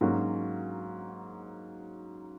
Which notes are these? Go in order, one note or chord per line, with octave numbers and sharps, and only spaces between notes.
G#2 F#3 A#3 C#4 F#4